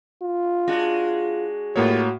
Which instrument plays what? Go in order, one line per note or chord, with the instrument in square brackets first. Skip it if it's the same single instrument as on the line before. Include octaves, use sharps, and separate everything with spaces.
[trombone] F4
[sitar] G#3 D4 F#4
[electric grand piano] A2 A#3 C#5 [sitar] G3 B3 F4 [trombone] F#4